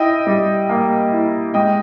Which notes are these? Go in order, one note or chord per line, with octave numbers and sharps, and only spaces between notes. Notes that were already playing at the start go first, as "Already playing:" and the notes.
Already playing: E4 D#5 G5
G3
A#3
E4
G#3 D#5 G5